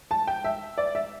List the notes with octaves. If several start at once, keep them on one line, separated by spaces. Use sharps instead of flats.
A5
G5
E5
D5
E5